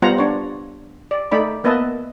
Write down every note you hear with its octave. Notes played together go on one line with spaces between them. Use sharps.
G3 B3 F4 C5 F#5 A#5
D4 C#5
D5
A3 D#4 D5 B5
A#3 B3 B4 D#5 E5 A5